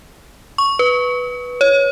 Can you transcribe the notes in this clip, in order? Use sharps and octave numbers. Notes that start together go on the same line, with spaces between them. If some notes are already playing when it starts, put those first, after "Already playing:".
C#6
B4
C#5